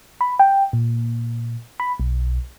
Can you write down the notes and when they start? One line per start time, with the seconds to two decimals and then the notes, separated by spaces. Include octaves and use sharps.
0.21 B5
0.39 G5
0.73 A#2
1.80 B5
2.00 B1